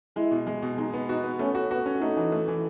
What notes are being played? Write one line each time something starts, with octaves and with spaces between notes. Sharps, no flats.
G#3 E4
B2
G#3
B2
G#3 D#4
B3
D#4 F#4
B3
A3 C#4
F#4
B3 F#4
C#4
A3 D#4
E3
A3
E3